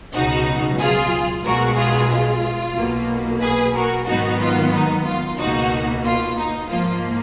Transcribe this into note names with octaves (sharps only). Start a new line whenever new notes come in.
C#2 B2 F#3 D#4 F#4
F4 G#4
B1 B2 G#3 F#4 A#4
F4 G#4
F4
B1 B2 A#3
G#4 B4
F#4 A#4
G#2 D#3 F#3 B3 D#4 F#4
F4
D#4
F4
C#2 B2 A#3 D#4 F#4
F4
D#4
G#2 F3 A#3 F4